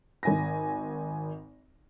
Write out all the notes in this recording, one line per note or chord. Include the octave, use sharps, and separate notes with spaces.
G#1 G#5 A#6